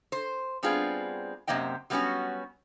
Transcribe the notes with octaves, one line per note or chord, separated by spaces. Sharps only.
C5
G3 B3 C4 D4 F4 G#4
F#2 C3 A#3 C5 D#5 G5
F#3 G3 A3 B3 C#4 F#4